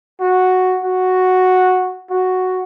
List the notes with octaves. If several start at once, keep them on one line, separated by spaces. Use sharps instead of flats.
F#4
F#4
F#4